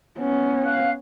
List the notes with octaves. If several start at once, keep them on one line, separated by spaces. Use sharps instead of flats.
B3 C#4
F5 F#6